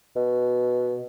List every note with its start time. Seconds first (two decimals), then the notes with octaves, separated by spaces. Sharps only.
0.16 B2